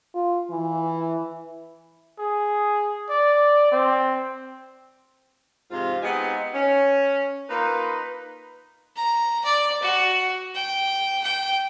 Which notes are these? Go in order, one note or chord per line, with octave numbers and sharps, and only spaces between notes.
F4
E3
G#4
D5
C4
G#2 C3 F3 F4
G#3 B3 C4 D#4 G4 G#4
C#4
A#3 D#4 F4 B4
A#5
D5
F#4
G5
G5